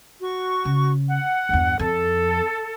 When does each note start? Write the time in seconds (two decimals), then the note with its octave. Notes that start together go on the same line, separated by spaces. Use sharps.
0.21 F#4 C#6
0.65 C#3
1.08 F#5
1.49 E2 G2
1.79 F2 A4